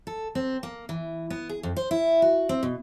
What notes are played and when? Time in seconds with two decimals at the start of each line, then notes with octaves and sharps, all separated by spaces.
0.07 A4
0.35 C4
0.63 A#3
0.89 E3
1.30 B3
1.49 G#4
1.63 F2
1.77 C5
1.91 E4
2.22 F#4
2.49 C4
2.63 B2